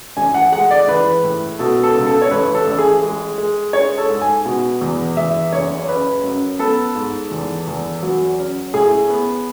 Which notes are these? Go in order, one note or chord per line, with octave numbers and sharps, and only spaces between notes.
A1 G#5
F#5
G#3 F#5
D5
E3 B4
A2
B2 A4
A4
C#2
A4
C#5
A1 B4
A4
A1
G#4
G#3
G#3
G#3 C#5
A4
G#2
G#5
B2
E2
E2 E5
F#1 C#5
C#4 B4
F#2
B3 A4
G#2
E2
E2
F#3
C#4
A2 G#4
B3